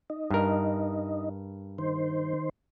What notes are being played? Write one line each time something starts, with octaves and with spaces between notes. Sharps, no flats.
D#4
G2 A#4
D#3 C5